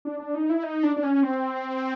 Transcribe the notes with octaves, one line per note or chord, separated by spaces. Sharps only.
D4
D4
D#4
E4
D#4
D4
D4
C#4
C4